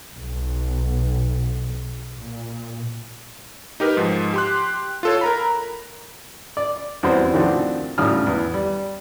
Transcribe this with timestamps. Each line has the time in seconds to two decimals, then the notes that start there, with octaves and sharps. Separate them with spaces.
0.14 B1
2.16 A#2
3.80 D#4 G4 A#4 B4
3.97 G#2 F3
4.34 G4 C6 F#6
5.03 F4 A4 C#5
5.21 A#4 A#5 B5
6.57 D5
7.03 E2 G3 C4 F#4 C5
7.33 A2 D#3 F3 C4 D4 F#4
7.98 G#1 A2 C#3 G3 D#6 F6
8.27 E2
8.54 G3